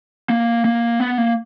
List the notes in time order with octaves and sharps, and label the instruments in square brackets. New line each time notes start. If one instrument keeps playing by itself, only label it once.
[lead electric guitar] A#3
A#3
B3
A#3